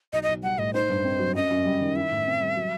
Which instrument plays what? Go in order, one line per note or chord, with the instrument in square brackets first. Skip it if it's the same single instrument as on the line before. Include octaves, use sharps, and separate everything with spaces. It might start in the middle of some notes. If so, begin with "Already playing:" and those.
[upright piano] B1 [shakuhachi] D#5
[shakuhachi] D#5
[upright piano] B1
[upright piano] G3 [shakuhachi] F#5
[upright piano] A2 [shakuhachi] D#5
[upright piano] D#4 [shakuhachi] C5
[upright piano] G2
C4
F#3
[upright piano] F#2 [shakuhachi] D#5
[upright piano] F#2
G3
D#3
[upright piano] E4 [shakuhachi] E5
[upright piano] A2
C4
G3
F#3